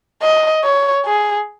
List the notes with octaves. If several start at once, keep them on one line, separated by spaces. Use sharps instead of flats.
D#5
C#5
G#4